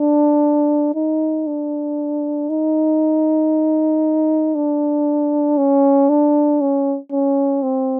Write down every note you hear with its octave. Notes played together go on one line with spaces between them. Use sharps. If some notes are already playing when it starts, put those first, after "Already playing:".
Already playing: D4
D#4
D4
D#4
D4
C#4
D4
C#4
C#4
C4